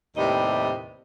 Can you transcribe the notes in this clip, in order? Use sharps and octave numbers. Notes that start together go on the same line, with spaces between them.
D#2 A2 C3 G3 B4 D#5